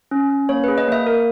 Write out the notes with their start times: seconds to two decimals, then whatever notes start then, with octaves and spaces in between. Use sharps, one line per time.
0.11 C#4
0.30 C#4
0.49 A#3 C#5
0.64 B4
0.68 G#4
0.78 D#5
0.88 A#3 E5
1.06 A#3 A#4